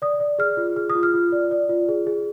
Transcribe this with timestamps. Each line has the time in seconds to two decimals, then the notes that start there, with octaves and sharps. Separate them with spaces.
0.02 D5 D#6
0.20 D5
0.39 G#4 F6
0.57 F4
0.76 G#4 F6
0.90 D#6
0.95 F4
1.03 F6
1.14 F4
1.32 D5
1.51 D5
1.69 F4
1.89 G#4
2.07 G#4